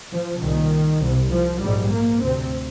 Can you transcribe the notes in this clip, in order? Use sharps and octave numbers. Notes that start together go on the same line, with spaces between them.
F3
C2 A#2 D#3
C2 C3
F3
A#1 G#2 G3
A#3
D2 C3 C4